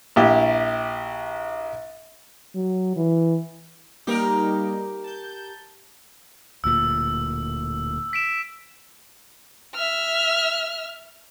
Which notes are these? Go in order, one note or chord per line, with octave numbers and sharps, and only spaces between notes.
A#1 E4 G4
F#3
E3
G3 A#3 D#4 G4 A#4
A5 G6
D1 D2 A#2 E6
B6 D7 E7
E5 F6